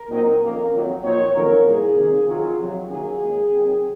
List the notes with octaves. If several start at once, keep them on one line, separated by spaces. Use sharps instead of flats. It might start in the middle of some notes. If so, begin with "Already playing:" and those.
Already playing: A#4
A#2 F#3 C4 D#4
F2 D#3 A#3 C#4 A#4
F2 D#3 F#3
A#2 F3 C4 D#4 C#5
F2 D#3 F#3 A#3 C#4 A#4
C2 A#2 F3 A#3 G#4
C3 D#3 A#3 C#4
F2 D#3 F#3 C4 D#4 F4
F2 C3 F#3
F#2 D#3 F#3 A#3 C#4 G#4
D#2 D#3 G#3 C#4
C3 D#3 F#3